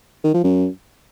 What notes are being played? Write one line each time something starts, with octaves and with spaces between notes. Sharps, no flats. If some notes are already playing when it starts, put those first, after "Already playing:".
D#3
F3
F#2